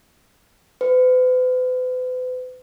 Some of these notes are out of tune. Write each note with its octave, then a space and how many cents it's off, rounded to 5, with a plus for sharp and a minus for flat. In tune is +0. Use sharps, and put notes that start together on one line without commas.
B4 +45